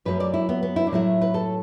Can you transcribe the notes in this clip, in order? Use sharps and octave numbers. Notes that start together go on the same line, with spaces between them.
F#2 F#3 A3 B4
D5
E4
B3
B3
E4
D4
A2 F#3 A3 E4
B4
A4